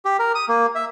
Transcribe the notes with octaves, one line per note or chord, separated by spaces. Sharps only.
G4
A#4
D#6
A#3
E5